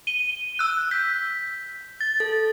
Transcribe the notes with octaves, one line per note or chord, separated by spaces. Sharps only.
D#7 G7
E6 F#6
G6 B6
A6
A4